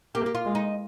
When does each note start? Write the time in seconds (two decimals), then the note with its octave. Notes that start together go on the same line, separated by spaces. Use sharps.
0.15 A#3 G4
0.26 G4
0.35 F4
0.45 G#3
0.55 D#4